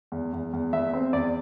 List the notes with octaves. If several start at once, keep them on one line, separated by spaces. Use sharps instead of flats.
E2
E2
E2
E2 E5
C4
E2 D5